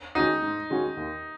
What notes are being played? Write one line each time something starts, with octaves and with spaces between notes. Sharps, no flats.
D#3 G#3 C#4 D#4 F#4
G#2
D#3 G#3 C#4 F#4
D#2